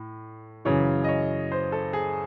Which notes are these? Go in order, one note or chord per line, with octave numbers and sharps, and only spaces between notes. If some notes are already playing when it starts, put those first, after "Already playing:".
Already playing: A2
F#2 C#3 E3 C#5
D#5
C#5
C5
A4
G#4